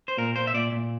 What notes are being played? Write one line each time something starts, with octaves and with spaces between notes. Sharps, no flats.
C5
A#2 A#4
A#2 C5
E5
A#2 D5
A#2